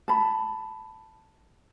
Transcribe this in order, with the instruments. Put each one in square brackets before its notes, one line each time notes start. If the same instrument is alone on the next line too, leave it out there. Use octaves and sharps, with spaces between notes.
[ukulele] A5 B5